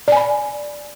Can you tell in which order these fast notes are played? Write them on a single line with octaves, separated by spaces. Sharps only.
D5 G#5 B5